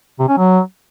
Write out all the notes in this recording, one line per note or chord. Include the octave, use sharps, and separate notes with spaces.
C3
C#4
F#3